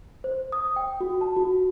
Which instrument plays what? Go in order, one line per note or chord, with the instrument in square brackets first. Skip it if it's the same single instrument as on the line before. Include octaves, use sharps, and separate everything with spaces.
[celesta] C5
D#6
G5
F#4
A5
F#4